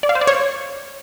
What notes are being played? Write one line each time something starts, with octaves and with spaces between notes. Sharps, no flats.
D5
F5
C5
D5
C#5